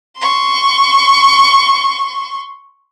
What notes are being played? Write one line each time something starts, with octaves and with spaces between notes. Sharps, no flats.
C6 C#6